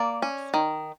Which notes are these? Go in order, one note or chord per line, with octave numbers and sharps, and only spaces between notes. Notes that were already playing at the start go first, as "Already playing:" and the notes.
Already playing: A#3 D5
C#4
D#3